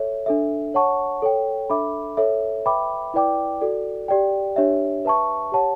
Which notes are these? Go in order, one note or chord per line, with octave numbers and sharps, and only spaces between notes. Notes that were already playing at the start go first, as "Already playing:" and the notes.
Already playing: A4 C#5 E5
D4 A4 E5
C#5 F#5 A5 C#6
A4 C#5 G5
D4 A4 E5 B5 D6
A4 C#5 E5
B4 E5 G5 B5 D6
E4 B4 D5 G5 D6
F#4 A4 D5
G4 D5 G5
D4 G4 C#5 E5
B4 E5 A5 C#6
G4 C#5 F#5 A5